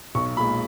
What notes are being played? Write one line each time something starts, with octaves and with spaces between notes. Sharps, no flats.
B1 C#6
A#2 G#3 B5